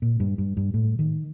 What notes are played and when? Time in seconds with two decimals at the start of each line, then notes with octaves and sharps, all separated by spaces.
0.02 A#2
0.20 G2
0.38 G2
0.57 G2
0.74 A2
0.99 D#3